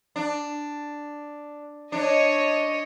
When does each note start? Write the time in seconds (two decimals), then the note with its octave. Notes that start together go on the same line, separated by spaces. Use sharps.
0.16 D4
1.92 D4 C#5 D#5